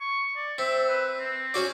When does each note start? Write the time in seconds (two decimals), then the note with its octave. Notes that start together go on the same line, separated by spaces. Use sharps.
0.01 C#6
0.36 D5
0.58 C4 E5
0.89 B4
1.19 C4
1.54 C#4 F#4 D5